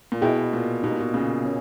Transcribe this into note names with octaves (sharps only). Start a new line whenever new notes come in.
A#2
B2 E4 G#4 D#5 G5
A#2
B2 D#4 G4 A#4
A#2
B2
A#2 C#3
A#3 C#4